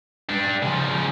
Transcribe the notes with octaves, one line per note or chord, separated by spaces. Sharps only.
G3 D4
C#3 F3